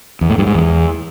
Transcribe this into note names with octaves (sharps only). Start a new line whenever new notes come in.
E2
A2
G2
G#2
E2